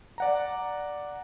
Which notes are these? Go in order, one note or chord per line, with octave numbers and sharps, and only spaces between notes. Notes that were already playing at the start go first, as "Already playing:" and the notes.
D5 F#5 A#5